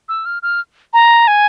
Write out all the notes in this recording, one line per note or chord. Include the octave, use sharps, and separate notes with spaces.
E6
F6
F6
A#5
G#5